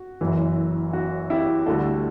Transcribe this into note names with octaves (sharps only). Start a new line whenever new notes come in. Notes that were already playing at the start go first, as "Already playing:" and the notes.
Already playing: F#4
F#1 F#2 E3
F#4
E4 G4
D2 D3 G3 F#4 A4